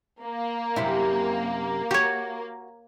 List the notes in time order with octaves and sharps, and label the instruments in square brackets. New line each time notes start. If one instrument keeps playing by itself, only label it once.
[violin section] A#3
[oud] F#2 C3 E4
[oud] F#4 [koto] G4 C#5